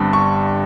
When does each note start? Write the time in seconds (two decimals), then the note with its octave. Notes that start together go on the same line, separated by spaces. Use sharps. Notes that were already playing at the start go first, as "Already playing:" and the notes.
Already playing: G1 G2 G3 C4
0.13 C#6